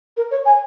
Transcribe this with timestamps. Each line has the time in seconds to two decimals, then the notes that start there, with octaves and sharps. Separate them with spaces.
0.17 A#4
0.31 C#5
0.45 G#5